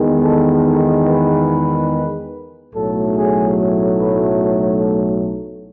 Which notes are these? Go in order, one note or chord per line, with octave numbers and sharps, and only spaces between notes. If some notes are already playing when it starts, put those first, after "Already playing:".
Already playing: E2 D#3 G#3 B3
A4
A4
B4
B1 A2 F#3 A3 A4
G#4
B4
A4